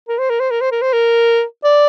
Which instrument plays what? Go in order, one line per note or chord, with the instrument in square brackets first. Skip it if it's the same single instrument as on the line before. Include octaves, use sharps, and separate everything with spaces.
[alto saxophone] A#4
C5
A#4
C5
A#4
C5
A#4
C5
A#4
D5